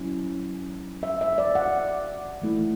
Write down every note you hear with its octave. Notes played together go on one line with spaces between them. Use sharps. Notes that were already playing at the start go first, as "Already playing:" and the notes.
Already playing: F#3 C#4 E4
E5
E5
D5
F#5
E3 A3 E4